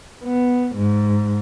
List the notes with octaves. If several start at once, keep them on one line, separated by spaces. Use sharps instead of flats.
B3
G#2